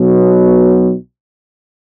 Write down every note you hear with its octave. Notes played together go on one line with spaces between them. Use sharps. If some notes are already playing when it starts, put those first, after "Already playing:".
Already playing: B1 B2 F#3